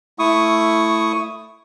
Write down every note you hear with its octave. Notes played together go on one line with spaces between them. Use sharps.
A3 E4 C#6 D#6